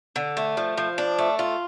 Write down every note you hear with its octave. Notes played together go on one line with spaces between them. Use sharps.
D3
A3
F3
F3
D4
A3
F4